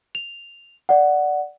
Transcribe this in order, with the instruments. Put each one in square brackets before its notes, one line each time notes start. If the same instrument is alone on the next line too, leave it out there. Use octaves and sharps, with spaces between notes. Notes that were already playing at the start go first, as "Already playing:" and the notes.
[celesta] F7
D5 F#5